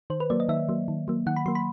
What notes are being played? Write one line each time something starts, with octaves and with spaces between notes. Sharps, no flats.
D#3 C5
B4
F#3 A#3 D5
D#5
D#3 E5
F#3 A#3
D#3
F#3 A#3
D#3 F#5
B5
F#3 A#3 C6
B5